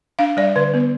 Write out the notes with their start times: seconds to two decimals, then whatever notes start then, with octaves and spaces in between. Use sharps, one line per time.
0.19 D4 F5
0.37 G3 D5
0.56 D3 B4
0.74 B3